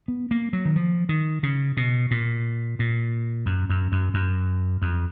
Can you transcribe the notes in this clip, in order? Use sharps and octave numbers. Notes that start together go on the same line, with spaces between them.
B3
A#3
F#3
D#3
F3
D#3
C#3
B2
A#2
A#2
F#2
F#2
F#2
F#2
F2